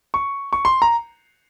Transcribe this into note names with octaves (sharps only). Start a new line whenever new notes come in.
C#6
C#6
C6
A#5